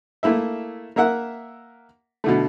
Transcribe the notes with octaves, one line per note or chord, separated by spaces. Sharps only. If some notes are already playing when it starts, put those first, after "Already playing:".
A3 A#3 E4 E5
A#3 A#4 E5 F#5
B2 D3 A3